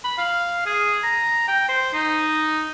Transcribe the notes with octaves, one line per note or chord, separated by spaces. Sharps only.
B5
F5
G#4
A#5
G5
C5
D#4